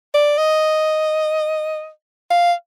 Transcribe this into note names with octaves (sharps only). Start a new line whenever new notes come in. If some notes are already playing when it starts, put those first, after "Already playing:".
D5
D#5
F5